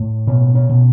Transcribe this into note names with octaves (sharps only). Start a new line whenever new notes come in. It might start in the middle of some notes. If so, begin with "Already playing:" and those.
Already playing: A2
B2 C#4
C#4
B2